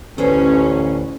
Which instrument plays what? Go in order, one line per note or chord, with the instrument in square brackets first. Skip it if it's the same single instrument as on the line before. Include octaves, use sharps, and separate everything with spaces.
[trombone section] A1 [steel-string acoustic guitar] D2 B4 C5 [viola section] C#4